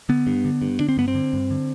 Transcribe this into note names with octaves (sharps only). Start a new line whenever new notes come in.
D3 B3
G2
D3
G2
D3 D4
C4
G2 B3
C4
D3
G2
D3